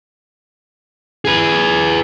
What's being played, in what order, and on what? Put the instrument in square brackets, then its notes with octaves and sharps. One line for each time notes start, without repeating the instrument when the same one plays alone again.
[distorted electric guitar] G#4 B4